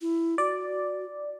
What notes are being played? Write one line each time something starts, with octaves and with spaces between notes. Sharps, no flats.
E4
F#4 D5